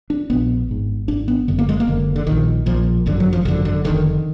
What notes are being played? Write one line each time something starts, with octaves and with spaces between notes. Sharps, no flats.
D4
A#1 A#2 B3
G#1 G#2
G#1 G#2 D4
B3
F#1 F#2 D3 B3
A#3
G#3
A#3
F#1 F#2 D3
D3
A#1 A#2 D#3
A#1 A#2 F3
G#1 F#2 D3
F#3
F3
G#1 F#2 D3 D#3
D3
F1 D#2 D3 D#3